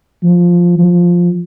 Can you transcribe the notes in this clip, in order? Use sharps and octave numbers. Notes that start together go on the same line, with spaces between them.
F3
F3